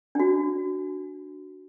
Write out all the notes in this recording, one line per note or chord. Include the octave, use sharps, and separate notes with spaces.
D4 F#4